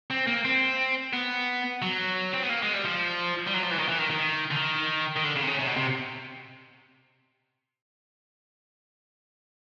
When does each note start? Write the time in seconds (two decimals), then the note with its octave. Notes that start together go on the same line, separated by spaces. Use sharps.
0.10 C4
0.27 A#3
0.45 C4
1.13 B3
1.82 F#3
2.34 C4
2.43 B3
2.50 A#3
2.62 G#3
2.73 G3
2.84 F3
3.47 G3
3.54 F#3
3.62 F3
3.71 E3
3.78 D#3
3.88 E3
3.98 D#3
4.10 D#3
4.51 D3
4.56 D#3
5.16 D#3
5.24 D3
5.36 C#3
5.43 C3
5.47 C#3
5.59 C3
5.67 B2
5.76 C3